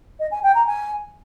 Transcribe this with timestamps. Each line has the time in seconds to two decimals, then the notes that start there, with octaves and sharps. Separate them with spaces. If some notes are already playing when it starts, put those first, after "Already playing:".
0.19 D#5
0.31 G#5
0.43 G5
0.55 A#5
0.66 G#5